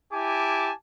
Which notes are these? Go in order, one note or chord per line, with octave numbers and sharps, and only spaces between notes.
E4 G4 G#5 A5 D6